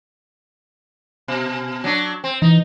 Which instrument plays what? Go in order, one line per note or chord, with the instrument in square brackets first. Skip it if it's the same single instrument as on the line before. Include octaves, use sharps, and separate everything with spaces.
[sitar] B2
F#3 D4
C4
[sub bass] E3 [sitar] D#4